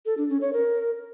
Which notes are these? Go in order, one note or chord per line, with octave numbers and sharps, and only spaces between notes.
A4
D4
C#4
C#5
A#4